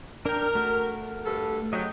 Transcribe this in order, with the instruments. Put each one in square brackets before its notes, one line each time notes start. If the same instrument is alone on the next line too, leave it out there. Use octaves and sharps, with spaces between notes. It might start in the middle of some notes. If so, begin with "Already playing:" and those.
[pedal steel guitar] D4 G5 [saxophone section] A#4
[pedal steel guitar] A3 F#4
[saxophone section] G2 A4
[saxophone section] G#2 C#3 F#3 [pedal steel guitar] D#5 G5